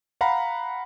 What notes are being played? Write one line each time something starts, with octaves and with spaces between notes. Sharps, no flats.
F5 F#5 A#5 B5